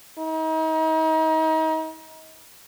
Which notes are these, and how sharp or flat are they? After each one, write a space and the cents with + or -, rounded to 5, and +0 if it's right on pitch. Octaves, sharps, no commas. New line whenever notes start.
D#4 +35